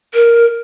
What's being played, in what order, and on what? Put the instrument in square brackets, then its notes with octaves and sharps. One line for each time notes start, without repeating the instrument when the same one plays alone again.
[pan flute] A#4